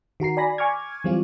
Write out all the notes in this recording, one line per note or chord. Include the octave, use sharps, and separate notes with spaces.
D#3 F#4 A#5 C7
D5 G#5 B5 A#6
G#5 C#6 D6 F6 G#6
E3 F#3 G3 C4 F4